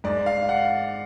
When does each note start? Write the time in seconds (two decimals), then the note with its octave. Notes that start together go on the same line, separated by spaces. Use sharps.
0.04 G#2 D5
0.26 F5
0.49 F#5